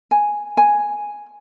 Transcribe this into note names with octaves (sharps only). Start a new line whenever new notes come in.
G#5
G#5